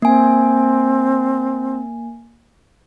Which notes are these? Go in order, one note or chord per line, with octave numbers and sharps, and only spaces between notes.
A#3 C4 G#5